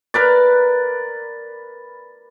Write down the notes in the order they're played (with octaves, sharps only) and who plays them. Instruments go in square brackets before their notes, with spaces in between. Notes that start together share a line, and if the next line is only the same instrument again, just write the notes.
[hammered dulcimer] A#4 B4 D5